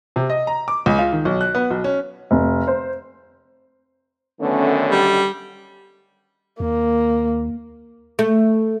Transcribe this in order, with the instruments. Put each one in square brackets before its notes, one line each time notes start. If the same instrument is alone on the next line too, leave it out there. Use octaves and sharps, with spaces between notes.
[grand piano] C3
D#5
A#5
D6
C#2
F4
D#3
B1
F#6
B3
B1
C#4
[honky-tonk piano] F1
C5
[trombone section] F#2 D3 D#3 [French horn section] A3 B3 C#4
[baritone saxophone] G3
[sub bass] D#2 [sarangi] A#3
[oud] A3